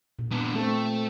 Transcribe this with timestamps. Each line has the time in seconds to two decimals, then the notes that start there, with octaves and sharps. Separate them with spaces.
0.19 A#2
0.31 B3 D4
0.54 A3 C4 A4